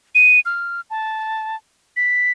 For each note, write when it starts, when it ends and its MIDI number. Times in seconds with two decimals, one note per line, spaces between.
0.15 0.40 99
0.46 0.81 89
0.90 1.56 81
1.97 2.32 95